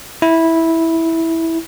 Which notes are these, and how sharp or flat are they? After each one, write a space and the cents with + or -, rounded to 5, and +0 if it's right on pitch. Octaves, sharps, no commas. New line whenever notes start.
E4 -10